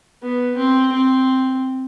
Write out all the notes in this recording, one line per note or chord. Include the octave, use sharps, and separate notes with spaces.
B3
C4
C4